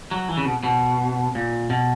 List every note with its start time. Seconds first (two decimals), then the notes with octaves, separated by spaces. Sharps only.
0.11 F#3
0.29 E3
0.37 C#3
0.46 B2
0.64 B2
1.35 A#2
1.70 B2